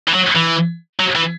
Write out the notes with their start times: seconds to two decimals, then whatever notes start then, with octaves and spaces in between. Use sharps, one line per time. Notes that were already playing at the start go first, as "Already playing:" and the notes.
0.08 E3
0.14 F#3
0.36 E3
0.99 F#3
1.15 E3